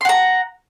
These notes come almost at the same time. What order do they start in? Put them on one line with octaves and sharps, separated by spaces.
C6 F#5 A#5